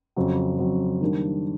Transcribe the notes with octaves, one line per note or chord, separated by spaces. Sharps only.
F2 C#3 F#3
F2 C#3 F#3
D#3 G3 A#3 D4